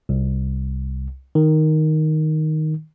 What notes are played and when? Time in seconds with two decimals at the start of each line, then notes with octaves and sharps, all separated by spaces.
0.09 C2
1.35 D#3